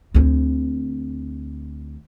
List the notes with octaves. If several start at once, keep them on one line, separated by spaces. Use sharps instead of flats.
D2 C4